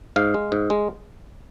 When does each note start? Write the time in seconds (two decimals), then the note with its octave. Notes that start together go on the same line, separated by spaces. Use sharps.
0.16 G#2 F5
0.34 G#3
0.52 G#2
0.70 G#3